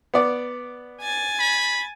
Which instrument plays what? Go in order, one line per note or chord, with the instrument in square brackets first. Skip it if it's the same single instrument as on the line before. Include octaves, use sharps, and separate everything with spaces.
[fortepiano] B3 D5
[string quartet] G#5 G#6 A6
[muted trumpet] B5